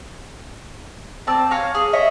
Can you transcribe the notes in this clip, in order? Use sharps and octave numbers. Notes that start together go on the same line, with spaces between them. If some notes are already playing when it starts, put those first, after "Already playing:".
C4 D5 A5 E6
C#5 F5 G#5 A#5
G#4
C#5 D#5 E5